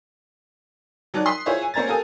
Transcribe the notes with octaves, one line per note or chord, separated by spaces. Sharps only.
F#3 D#4 D5 A5 F#6
C6 D#6 B6
E4 F4 G#4 C5 C#5 E5
G#5
A#3 C#4 C5 A#5 G#6 A6
G4 A4 A#4 F5 G#5 D#6